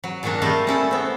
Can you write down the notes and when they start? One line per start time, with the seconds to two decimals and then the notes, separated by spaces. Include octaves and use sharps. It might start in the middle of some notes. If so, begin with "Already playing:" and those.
0.04 F#3
0.23 A#2 D#3 F#3 A#3 D4
0.42 G3 A3 A#3 D#4 F4
0.67 C#4 E4 A4
0.91 B3 C4